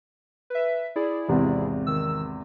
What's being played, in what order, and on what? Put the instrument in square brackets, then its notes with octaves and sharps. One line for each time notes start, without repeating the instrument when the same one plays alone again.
[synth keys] B4 E5
E4 G#4 D5
[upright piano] G#1 E2 C3
[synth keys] D#3 E6